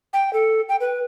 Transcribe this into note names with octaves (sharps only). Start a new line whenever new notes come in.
G5
A4
G5
B4